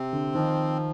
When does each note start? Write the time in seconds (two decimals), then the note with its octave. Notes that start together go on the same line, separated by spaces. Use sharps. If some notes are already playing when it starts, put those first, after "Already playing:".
Already playing: C3 C4
0.13 D3
0.35 D#3 F3